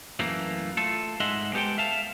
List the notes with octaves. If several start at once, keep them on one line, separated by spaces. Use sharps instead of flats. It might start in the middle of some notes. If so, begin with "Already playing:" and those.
F#2 E3 A3 A#3
A3 F4 A4
G#2 G#3 D#5 E5 F#5 C6
G#3 B3 G4 A4 C5 G5
E5 F5 A5